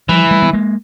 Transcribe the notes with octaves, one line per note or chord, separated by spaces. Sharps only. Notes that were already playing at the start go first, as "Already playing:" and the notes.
E3 F3 G3
G3 A3
B3
G#3 A#3